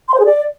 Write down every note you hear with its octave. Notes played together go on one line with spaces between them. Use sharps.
C6
C5
G#4
D5